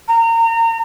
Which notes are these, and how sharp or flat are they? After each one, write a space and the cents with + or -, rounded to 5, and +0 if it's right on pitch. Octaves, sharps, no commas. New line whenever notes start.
A#5 -30